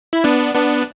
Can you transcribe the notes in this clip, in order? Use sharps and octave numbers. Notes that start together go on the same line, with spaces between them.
E4
B3 D4
B3 D4